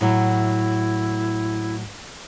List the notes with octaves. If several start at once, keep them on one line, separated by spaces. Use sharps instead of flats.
A2 F#3 E4